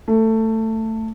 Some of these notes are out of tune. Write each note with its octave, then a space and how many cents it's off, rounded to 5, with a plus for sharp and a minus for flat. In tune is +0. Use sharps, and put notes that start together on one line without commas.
A3 +15